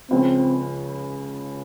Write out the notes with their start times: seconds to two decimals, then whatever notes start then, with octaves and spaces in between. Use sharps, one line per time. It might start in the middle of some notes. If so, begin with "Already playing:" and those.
0.11 C#2 C#3 F3 C4